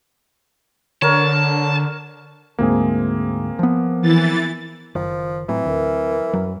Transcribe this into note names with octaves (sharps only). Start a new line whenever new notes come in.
D3 A#4 C#5 A5
D2 G#2 A#3 C4 G#4
F3 B3
E3 A6
F#1 D#3 F3
A2 E3 F#3 C4
D2 A#4
F#2 F#3